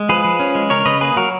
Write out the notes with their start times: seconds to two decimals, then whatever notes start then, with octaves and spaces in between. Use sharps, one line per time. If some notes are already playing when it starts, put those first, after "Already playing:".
Already playing: G#3
0.09 F3 G#4 B4
0.24 F3
0.40 C#4
0.55 G#3
0.70 C#3 A#4 C#5
0.86 C#3 B4 D#5
1.01 A#3 G#4 B4
1.16 F#3 F#4 A#4